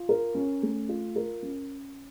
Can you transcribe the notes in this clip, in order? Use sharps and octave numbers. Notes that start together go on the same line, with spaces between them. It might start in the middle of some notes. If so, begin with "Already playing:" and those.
Already playing: F4
A#4
C#4
A3
F4
A#4
C#4